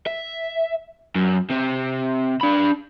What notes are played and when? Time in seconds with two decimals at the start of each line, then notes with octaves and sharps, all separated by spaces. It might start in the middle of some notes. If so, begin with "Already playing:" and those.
0.07 E5
1.15 F#2
1.51 C3
2.41 D4 B5